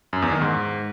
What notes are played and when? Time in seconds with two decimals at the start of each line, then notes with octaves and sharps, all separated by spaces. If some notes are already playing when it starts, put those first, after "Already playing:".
0.13 F#2
0.22 E2
0.32 D#3
0.41 G#2